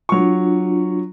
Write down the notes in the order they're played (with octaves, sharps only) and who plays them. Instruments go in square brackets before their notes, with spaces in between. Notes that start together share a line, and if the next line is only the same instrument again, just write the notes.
[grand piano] F#3 C#6 [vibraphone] D4 F4